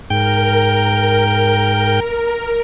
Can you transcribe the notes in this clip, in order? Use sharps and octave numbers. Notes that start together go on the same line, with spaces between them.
G#2 A#4 G5